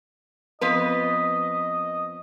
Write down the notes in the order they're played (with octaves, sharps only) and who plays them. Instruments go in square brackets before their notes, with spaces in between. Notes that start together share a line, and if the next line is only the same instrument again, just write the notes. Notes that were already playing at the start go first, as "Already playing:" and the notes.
[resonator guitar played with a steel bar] F2 B3 B4 [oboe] D#5